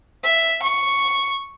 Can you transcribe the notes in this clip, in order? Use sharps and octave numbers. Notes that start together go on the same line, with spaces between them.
E5
C#6